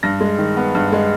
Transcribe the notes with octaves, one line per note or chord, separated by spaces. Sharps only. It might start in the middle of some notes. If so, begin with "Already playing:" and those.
G2 A#6
G#3
D#3
B3
G2
G#3